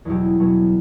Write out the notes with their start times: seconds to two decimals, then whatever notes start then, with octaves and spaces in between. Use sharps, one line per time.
0.05 E2 B2 F#3 E4 G4
0.39 E2 B2 F#3